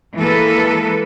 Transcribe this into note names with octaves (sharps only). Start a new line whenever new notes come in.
E3 G#3 A#3 A4 B4